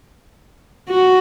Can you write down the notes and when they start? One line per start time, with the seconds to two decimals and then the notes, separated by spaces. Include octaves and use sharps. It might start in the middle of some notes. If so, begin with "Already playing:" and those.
0.89 F#4